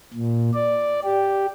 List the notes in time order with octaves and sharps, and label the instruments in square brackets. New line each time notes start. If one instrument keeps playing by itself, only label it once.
[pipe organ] A#2
D5
G4